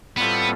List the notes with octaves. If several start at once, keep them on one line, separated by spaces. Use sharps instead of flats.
A2 G3 B3 C4 F4 A4